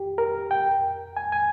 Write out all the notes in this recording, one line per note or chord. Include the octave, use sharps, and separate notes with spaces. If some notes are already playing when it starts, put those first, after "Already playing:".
Already playing: G4
A#4
G5
G#5
G#5